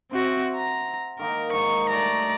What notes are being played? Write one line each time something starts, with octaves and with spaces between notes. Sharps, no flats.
C4 F#4 C5 E5 F#5
A#5
D#3 A#3 D#4 A#4
G#2 D#5 A#5 C#6
G3 A3 D5 A#5